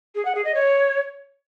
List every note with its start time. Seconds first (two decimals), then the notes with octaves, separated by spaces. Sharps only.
0.15 G#4
0.25 F#5
0.35 G#4
0.45 D#5
0.54 C#5